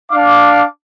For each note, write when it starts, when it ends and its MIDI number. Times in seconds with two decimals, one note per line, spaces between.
0.12 0.62 62
0.12 0.62 77
0.12 0.62 86